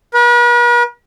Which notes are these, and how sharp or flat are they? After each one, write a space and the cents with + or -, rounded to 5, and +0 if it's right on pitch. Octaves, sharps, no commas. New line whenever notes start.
B4 -45